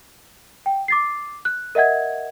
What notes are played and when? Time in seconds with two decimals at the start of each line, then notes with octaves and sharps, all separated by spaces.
0.66 G5
0.88 D6 A6 C7
1.45 F#6
1.75 A#4 D#5 E5 F#5 G#6